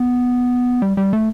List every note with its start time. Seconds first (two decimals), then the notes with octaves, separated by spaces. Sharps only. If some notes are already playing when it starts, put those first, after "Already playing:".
Already playing: B3
0.82 G3
0.97 G3
1.13 A3